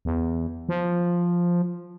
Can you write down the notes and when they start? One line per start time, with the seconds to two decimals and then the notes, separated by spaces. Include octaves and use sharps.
0.05 E2
0.69 F3